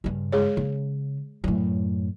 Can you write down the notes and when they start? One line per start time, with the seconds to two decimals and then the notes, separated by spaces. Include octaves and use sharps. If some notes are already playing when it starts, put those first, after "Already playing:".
0.04 G2 C#3
0.32 G#3 G#4 C#5
0.57 C#3
1.44 F#2 A2